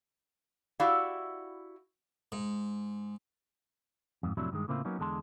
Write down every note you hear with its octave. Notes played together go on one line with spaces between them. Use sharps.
E4 F#4 G4 D5 E5 F5
G#2
F2 G#2
F2 A2 C3 F#3 D4 E4
G2 D#3 G#3
A2 C#3 A#3 C4 E4 F4
F#3 A#3 B3 C#4 D#4
E2 D3 G#3 A5 C6